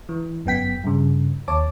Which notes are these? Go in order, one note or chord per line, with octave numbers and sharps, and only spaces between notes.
E3
G1 F#2 B3 G5 B6
G2 C#3
D#2 C#5 A5 D6